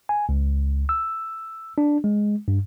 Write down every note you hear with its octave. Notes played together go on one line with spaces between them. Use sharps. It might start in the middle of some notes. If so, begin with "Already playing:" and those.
G#5
C#2
E6
D4
G#3
G2